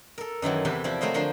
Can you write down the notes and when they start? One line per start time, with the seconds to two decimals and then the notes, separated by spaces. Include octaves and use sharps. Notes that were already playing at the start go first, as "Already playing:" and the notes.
0.18 A4 A#4
0.42 F#2 D#3 E3 F#3
0.65 E2 C3 E3 G4 B4
0.84 F3 E4 G4 D5
1.01 F#3 A3 A#4 C5 D#5
1.14 D3 F3 A#4 C6